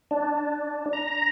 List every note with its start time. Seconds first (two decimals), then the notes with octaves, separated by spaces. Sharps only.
0.11 D4
0.93 A#5